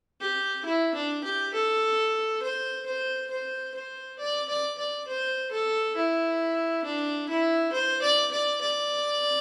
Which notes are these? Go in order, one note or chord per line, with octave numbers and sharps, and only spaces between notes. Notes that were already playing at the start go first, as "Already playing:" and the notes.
G4
E4
D4
G4
A4
C5
C5
C5
C5
D5
D5
D5
C5
A4
E4
D4
E4
C5
D5
D5
D5